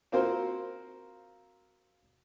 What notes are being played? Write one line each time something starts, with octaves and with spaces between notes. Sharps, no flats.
A#3 C4 F4 F#4 A#4 C5